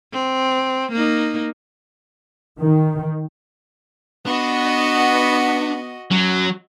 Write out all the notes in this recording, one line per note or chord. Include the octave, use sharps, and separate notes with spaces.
C4
A#3 D#4
D#3
B3 D4 F#4 D#5
F#3 C#4 F#4